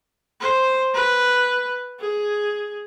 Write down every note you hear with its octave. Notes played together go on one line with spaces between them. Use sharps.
C5
B4
G#4